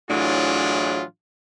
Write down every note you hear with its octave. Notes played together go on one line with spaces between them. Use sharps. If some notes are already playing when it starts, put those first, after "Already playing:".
A2 E3 F#3 D4 F4 G#4